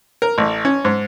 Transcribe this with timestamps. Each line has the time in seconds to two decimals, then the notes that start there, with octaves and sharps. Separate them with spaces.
0.22 A#4
0.38 A1
0.65 C#4
0.85 G#2